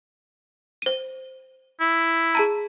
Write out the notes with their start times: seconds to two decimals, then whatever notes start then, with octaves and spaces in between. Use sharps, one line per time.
0.82 C5 D#7
1.81 E4
2.35 G#4 A5 A#5